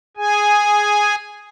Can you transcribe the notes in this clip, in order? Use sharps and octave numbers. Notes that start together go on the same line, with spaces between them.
G#4 G#5